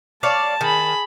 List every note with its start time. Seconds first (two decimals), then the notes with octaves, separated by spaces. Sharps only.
0.23 C#5 D5 F5 A5
0.61 D#3 G#4 B5